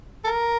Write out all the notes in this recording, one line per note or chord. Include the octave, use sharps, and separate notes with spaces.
A4
A#4